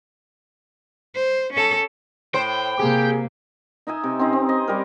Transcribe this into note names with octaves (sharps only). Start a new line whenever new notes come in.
C5
C#4 A4
A2 C5 G5
C3 A#3 G4 G#4
D#4 D#5 E5 G#5
C3
C4 C#4 D#4 C5
C4
D#5 G#5
G3 G4 A#4